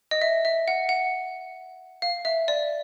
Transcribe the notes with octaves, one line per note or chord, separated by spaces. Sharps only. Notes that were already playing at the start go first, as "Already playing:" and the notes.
D#5
E5
E5
F#5
F#5
F5
E5
D5